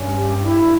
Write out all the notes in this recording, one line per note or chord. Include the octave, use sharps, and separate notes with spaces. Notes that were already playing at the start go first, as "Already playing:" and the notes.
Already playing: G2 C#4
G4
E4